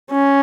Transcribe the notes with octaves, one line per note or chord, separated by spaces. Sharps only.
C#4